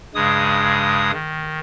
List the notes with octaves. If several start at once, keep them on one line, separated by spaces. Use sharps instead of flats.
G2 C#3 G#3 D#6
D#3